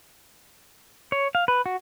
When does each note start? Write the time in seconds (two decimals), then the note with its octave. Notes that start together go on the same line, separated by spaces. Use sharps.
1.12 C#5
1.35 F5
1.48 B4
1.66 F#4